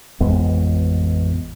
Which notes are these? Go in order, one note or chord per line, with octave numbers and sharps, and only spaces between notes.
A1 F2 G#3 B3